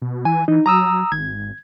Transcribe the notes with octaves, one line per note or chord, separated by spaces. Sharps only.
B2
E3 G#5
E3 D#4
F#3 A#5 D#6 E6
G#1 G#6